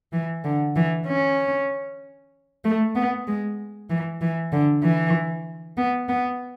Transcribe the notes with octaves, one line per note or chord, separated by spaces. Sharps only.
E3
D3
E3
C#4
A3
B3
G#3
E3
E3
D3
E3
B3
B3